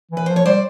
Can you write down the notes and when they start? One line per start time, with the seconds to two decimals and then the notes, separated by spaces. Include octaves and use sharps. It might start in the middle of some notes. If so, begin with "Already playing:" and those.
0.11 E3
0.17 B4
0.26 F3 C5
0.36 C#5
0.46 G3 C5 D5